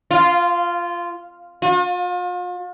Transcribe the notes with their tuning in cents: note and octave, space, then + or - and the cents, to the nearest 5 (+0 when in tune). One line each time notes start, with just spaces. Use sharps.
F4 -10
F4 +40